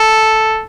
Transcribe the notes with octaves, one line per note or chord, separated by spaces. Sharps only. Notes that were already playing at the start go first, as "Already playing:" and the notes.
Already playing: A4